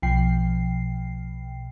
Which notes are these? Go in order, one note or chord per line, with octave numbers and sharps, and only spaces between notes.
B1 B2 F3 G5 C7